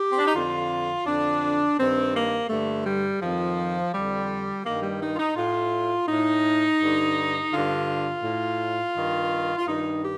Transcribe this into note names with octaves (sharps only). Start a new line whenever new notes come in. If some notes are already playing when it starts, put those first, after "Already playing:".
Already playing: G4
C4
D4
D#4
F2 D3 F4
F2 D3 D4
G2 D#3 C4
A#3
G2 D3 A3
G3
F2 D#3 F3
F2 D3 G3
G2 D#3 A#3
G3
D#4
F4
D#4
A2 F4
A2 D#4
G2 D3
G2 D3 F4
A2
G2 D#3
F4
G2 D#3 D#4
G4